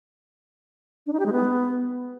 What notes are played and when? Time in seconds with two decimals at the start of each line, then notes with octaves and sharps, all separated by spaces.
1.06 D4
1.13 D#4
1.19 G4
1.26 G#3
1.32 B3